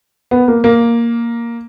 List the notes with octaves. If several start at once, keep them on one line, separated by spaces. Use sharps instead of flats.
B3
A#3
A#3